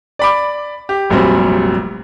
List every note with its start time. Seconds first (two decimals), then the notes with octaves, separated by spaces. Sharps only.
0.19 D5 B5 D6
0.89 G4
1.10 F1 A#1 F#3 G3 C4